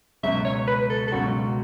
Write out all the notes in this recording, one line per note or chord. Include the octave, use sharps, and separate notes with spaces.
C#2 B2 F#3 E5
C#5
B4
A4
A4
C#2 B2 F#3 F#4